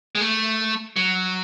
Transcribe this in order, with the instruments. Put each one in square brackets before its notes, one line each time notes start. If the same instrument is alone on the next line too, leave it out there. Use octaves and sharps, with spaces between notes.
[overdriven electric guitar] G#3
A3
F#3